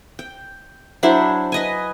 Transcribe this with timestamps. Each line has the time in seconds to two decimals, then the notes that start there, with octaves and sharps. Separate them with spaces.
0.19 G5
1.03 F#3 D4 E4 C5
1.52 B4 D#5 G#5